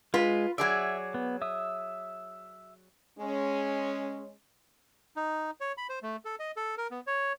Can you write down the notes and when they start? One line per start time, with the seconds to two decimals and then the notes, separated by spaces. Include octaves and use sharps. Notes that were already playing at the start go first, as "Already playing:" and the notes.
0.14 G#3 F4 B4
0.58 F#3 G#4 D5 E5
1.14 B3
1.42 E5 D#6
3.19 G#3 C#4
5.16 D#4
5.61 C#5
5.77 B5
5.89 C5
6.03 A3
6.25 A4
6.39 D#5
6.57 A4
6.78 A#4
6.91 B3
7.07 C#5